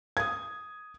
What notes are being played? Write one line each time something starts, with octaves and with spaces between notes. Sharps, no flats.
D#6 G#6